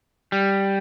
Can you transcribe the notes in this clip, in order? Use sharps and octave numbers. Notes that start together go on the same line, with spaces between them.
G3